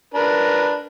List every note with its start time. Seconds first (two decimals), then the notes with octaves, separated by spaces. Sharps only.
0.14 D4 A#4 B4